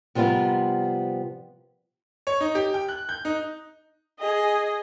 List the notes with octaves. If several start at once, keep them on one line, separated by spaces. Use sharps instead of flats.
C3 F3 G3 B3 F4 A#4
C#5
D#4
G4
G5
F#6
G6
D#4
G#4 D#5